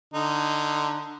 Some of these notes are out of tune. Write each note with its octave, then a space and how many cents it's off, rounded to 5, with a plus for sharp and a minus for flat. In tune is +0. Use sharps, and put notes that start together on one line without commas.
D3 +15 D#4 +0